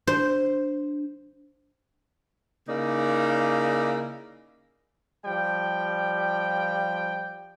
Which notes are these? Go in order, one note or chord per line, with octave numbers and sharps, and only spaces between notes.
D4 C5
C#3 A#3 D#4 E4 D5
F3 G3 G5